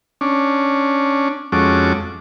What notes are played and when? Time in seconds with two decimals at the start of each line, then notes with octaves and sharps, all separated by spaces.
0.21 C#4 D4
1.52 F2 G#3 C#4 F#4 A4 D6